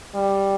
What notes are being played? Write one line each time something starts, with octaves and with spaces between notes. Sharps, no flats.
G3